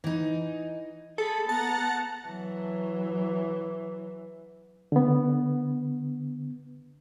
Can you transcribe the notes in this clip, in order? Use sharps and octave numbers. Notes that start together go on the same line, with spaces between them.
E3 D#4
G#4 A4 B5
B3 F#5 A5 A#5
E3 F#3
D3 B3